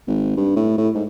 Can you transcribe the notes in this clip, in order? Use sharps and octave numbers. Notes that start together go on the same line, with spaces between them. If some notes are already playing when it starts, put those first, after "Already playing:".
G#1
G2
A2
A2
G#2